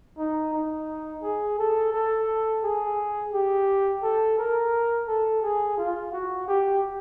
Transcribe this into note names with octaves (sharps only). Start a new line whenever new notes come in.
D#4
D#4
G#4
A4
A4
G#4
G4
A4
A#4
A4
G#4
F4
F#4
G4